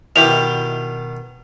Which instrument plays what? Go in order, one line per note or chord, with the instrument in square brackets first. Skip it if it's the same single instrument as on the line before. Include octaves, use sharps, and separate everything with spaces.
[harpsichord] B2 D#3 [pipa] F#3 E4 G4 [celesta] F7